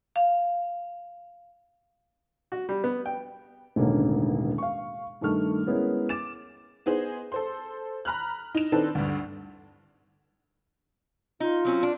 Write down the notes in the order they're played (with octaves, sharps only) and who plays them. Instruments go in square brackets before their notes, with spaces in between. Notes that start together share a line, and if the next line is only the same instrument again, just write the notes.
[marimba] F5
[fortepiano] F#4
G3
B3
G5
[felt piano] E1 A1 D3 D#3 A#3 C#4
F5 C#6
G2 D#3 A3 C#6 F6
G#3 B3 C#4 E4 G#4 A#4
D6 A6 E7
[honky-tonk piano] B3 D#4 G#4 C5
A4 C5 C6
A#5 B5 F6 F#6
D#4 E7
D#3 C4 D4 D#4 A4 B4
D2 G2
[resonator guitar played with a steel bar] D#4 [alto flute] F4
[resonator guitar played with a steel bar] F#3 C4 C#4
D4